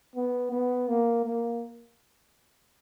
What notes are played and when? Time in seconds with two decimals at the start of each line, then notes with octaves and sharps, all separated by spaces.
0.16 B3
0.52 B3
0.88 A#3
1.25 A#3